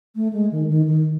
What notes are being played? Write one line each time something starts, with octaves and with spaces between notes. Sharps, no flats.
A3
G#3
D#3
D#3
D#3